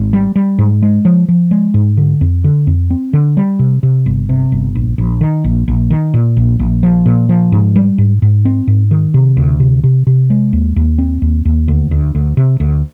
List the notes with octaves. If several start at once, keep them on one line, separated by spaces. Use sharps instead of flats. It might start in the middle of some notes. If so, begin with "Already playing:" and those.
Already playing: G#1
G3
G3
G#2
G#3
F3
F3
G#3
G#2
D3
F2
D3
F2
C4
D3
G3
C3
C3
G1
C3
G1
A#1
A#1
D#3
A#1
A#1
D#3
A#2
A#1
A#1
F3
A#2
F3
G#2
G3
G#2
G#2
C4
G#2
D#3
C3
D2
C3
C3
C3
G#3
D#2
D#2
C4
D#2
D#2
D2
D2
D2
C3
D2